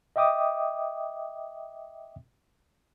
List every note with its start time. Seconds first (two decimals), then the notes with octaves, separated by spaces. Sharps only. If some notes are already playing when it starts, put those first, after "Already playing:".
0.16 D#5 E5 G5 D6 D#6